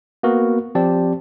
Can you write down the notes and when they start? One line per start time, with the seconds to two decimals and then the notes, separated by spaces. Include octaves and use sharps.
0.23 A#3 B3 F#4 A#4
0.75 F3 C4 G4 D5 A5